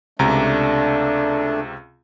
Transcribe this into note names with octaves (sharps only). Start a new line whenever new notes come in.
C#2 C3 A3 D4 A#5